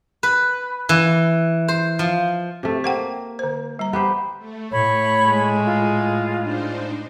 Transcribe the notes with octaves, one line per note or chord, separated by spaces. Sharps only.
B4
E3
C5
F3
C3 A3
A#3 C5 F#5 G5
D3 C5
G3 A#5
B3 G4 C5
A3
A2 C#5 B5
G#3
F4
D4 D#4 C5